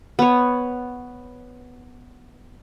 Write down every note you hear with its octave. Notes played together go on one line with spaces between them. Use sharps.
B3 C#5